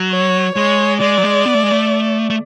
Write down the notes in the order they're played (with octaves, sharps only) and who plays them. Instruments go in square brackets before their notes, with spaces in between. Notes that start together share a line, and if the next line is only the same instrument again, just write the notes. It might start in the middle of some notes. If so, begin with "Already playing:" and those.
Already playing: [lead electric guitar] F#3
[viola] C#5
[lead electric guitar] G#3 [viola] C#5
[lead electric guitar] G#3 [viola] D5
[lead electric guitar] F#3
G#3
B3
A3
G#3
A3
A3